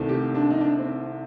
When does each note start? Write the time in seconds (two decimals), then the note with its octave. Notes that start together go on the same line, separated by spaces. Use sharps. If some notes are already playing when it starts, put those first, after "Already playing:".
Already playing: C2 C3 D#3 A3
0.09 G4
0.35 D4
0.50 D#4
0.60 D4
0.79 C4